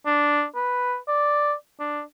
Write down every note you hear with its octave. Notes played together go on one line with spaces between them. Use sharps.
D4
B4
D5
D4